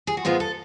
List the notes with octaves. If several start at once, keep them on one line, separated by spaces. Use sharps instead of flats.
G#4
F#4
G#2 G#3 B3 F4
A4